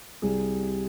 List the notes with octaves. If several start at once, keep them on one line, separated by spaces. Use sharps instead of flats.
C2 C3 G3 G#4